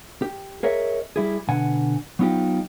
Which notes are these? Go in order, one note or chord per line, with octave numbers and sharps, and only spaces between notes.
G4
G#4 A#4 C#5 D#5 E5
G3 E4 G#4
B2 D3 F#5 G#5
F#3 B3 D#4 F4 G4